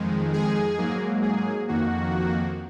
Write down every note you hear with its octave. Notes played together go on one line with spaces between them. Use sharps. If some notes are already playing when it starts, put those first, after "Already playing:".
Already playing: F2 D#3 G#3
G#4
G#2 F#3 A#3
G#4
F2 D#3 A#3 F#4